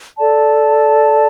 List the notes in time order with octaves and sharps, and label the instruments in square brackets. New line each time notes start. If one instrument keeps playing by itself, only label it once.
[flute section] A4 D5 A5